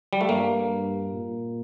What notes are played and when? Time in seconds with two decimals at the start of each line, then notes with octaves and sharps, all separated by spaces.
0.13 G3
0.21 A3
0.29 G2 A#3
1.11 A#2